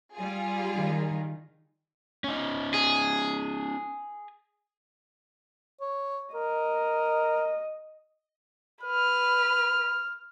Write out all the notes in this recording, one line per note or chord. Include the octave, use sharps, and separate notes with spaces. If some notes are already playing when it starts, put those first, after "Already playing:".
G3 F4 G#4
D#3
C#4 D#4
G#4
C#5
A#4 D#5
B4 F6